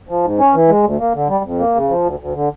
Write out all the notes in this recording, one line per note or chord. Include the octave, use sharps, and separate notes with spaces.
F3
G#2
C#4
E3
G#3
D2
A#3
D3
G3
F2
A#3
C#3
F3
D2
D2
D3